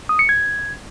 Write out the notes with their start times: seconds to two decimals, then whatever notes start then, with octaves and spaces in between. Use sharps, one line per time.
0.09 D#6
0.19 C#7
0.29 G#6